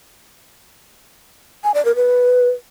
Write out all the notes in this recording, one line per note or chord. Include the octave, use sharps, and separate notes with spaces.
G#5
D5
A#4
B4